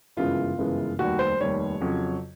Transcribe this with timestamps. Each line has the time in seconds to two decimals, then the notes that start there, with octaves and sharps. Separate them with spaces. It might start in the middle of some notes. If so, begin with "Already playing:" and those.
0.17 G1 F#2 C#3 E3 G#3 F4
0.58 G1 F#2 C#3 E3 G#3
0.98 F1 D#2 D#3 G3 F#4
1.19 C5
1.40 F1 D#2 D#3 G3 C#5
1.80 F2 C#3 F#3